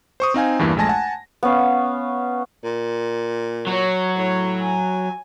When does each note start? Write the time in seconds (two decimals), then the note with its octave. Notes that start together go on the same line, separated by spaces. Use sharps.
0.20 C5 C#6 D#6
0.34 C4 D#4 F5 G#5
0.59 E2 G2 E3 A#3
0.76 A#1 G#3 A3 G#5 A5 A#6
0.89 F#5 G#5 A5
1.43 B3 C#4 F5
2.63 A#2
3.67 F#3 C#5
4.17 A2 C#5
4.61 G#5